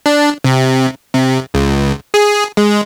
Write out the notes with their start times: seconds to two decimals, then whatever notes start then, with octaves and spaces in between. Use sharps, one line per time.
0.06 D4
0.44 C3
1.14 C3
1.54 C#2
2.14 G#4
2.57 G#3